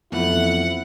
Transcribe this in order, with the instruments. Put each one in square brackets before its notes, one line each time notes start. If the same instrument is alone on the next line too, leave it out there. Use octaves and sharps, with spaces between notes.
[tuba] F2 [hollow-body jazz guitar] B2 E3 A3 [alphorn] E4 [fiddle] F#5